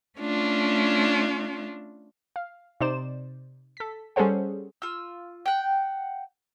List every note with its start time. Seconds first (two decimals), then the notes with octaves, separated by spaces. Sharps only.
0.19 A3 C#4 D4 F4
2.36 F5
2.80 C3 D#4 C5 D5 E7
3.77 A4 B6
4.16 G3 C#4 G#4 A4 C5 F#5
4.82 F4 E6
5.46 F#5 G5